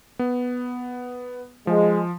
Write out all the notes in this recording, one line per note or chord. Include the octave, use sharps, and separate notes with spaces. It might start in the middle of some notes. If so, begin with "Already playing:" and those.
B3
F3 G#3